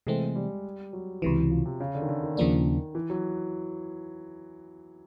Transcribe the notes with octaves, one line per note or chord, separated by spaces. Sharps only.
C3 E3 G#3 A3 C4
G3
F#3
C#2 C3 E3
F3
C3
C#3
D3
D#3
D3
D#3
D#2 C#3 F3 A#3 D4
E3
F#3